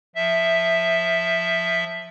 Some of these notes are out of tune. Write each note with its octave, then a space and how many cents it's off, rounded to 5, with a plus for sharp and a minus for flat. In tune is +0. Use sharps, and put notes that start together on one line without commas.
F3 +10 E5 +0